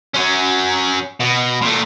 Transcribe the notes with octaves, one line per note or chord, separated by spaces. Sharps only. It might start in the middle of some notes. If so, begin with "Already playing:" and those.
F#3 C#4
B2
A#2 A3